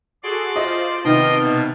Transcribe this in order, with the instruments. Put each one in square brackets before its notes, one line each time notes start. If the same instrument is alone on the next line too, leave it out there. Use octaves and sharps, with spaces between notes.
[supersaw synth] F#4 G#4 A4 [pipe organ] D5 C6
[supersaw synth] F4 C5 [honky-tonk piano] D#5
[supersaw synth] C3 F6 [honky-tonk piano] D#3 [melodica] B3 A5 [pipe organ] D#5 G5 C6
[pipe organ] B2